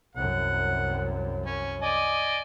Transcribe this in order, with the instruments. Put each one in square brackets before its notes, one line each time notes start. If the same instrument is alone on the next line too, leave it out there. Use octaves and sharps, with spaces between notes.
[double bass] C2 F#2 [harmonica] F#5
[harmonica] C#4
D5 D#5 G#5